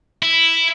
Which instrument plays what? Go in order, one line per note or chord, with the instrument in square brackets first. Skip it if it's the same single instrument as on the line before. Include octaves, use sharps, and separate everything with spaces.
[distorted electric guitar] E4